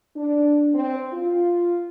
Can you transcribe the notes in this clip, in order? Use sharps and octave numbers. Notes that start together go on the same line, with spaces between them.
D4
C4
F4